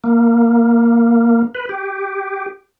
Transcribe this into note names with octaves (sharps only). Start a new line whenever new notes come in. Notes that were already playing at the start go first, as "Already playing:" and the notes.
A#3
B4
G4